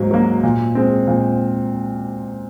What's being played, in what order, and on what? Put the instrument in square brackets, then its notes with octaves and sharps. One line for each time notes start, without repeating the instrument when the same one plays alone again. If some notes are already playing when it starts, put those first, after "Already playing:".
Already playing: [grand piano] G#2 F#3 A#3
F#3 A#3
A#2
G#3 C4
A#2